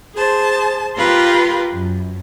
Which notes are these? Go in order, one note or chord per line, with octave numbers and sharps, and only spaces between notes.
G#4 C5 A5
F4 G4 A#4 B4 F5 C6
F#2